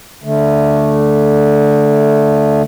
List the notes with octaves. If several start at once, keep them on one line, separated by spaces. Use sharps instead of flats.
D3 A3